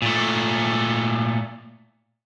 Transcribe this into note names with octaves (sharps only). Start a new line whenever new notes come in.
A#2 A3